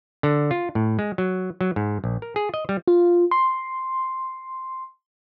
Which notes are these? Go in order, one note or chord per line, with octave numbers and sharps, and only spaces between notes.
D3
F4
A2
G#3
F#3
F#3
G#2
A#1
A#4
G#4
D#5
G3
F4
C6